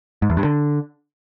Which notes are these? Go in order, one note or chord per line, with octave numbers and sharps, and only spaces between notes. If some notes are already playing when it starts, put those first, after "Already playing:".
G#2
E2
G2
D3